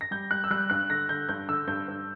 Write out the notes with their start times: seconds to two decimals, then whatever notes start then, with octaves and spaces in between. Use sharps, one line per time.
0.01 A#6
0.11 G3 G6
0.31 G3 F#6
0.44 E6
0.50 G3 F#6
0.70 G2 F#6
0.90 D3 A#6
1.09 D3 G6
1.29 G2 G6
1.49 D3 E6
1.68 G2 G6
1.88 G2